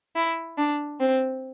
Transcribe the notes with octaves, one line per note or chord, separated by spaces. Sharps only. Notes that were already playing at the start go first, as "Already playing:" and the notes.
E4
D4
C4